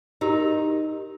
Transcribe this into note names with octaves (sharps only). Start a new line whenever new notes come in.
D#4 G4 A#4 D#5